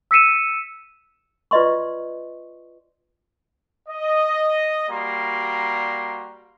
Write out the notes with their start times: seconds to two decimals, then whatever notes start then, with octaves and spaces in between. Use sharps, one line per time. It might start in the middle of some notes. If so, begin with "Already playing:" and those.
0.11 E6 B6 C#7 D#7 E7
1.51 F4 B4 D5 D#5 C6 C#6
3.89 D#5
4.89 G3 A#3 F#4 A#5 C6